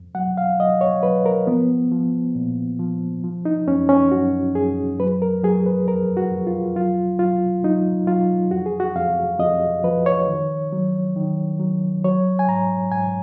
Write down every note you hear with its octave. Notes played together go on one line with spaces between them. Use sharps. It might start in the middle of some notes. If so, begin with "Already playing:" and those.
Already playing: F2
F#3 F#5
F5
F#3 D#5
C#5
F#3 B4
A#4
F3 B3
F3
A#2
F3
F3
D#4
F#2 C#4
C#4
F#2 F#4
F#2 G#4
F#3 B4
A#4
F#3 G#4
B4
F2 A#4
F#4
F2
F4
F#3 F4
F#3 F4
F#3 D#4
F#3 F4
F2 F#4
G#4
F#4
F2 F5
F2 D#5
F3 B4
C#5
D#3
F#3
D#3
F#3
F#3 C#5
G#5
G#2 A#5
G#2 G#5